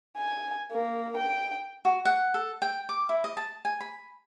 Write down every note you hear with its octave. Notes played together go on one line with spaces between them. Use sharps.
G#5
A#3
G5
F#4
F#5
A4
G5
D6
E4
D#5
A5
G#5
B5